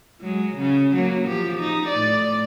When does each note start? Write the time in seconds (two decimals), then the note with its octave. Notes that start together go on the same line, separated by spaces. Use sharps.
0.22 F#3 G#3
0.58 C#3 C#4
0.94 F#3 A#3
1.28 F3 G4
1.60 D#4
1.88 A2 D5